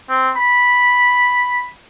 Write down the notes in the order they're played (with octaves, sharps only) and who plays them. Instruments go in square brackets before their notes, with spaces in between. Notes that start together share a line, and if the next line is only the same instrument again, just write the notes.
[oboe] C4
B5